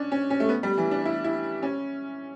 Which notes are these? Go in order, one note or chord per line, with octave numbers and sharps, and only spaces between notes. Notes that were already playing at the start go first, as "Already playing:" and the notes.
Already playing: C#4 D4
C#4
C#4
A3
B3
G3
E3
D4
E4
E4
C#4